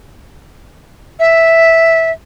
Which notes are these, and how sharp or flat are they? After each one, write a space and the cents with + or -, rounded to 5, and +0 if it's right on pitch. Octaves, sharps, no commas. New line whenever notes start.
E5 -5